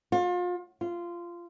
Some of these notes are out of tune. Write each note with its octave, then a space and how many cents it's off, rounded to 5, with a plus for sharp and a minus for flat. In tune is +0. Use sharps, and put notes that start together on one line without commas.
F4 +35
F4 -15